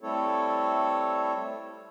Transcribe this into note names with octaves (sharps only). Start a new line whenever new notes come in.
G3 A3 C4 E4 A4 C#5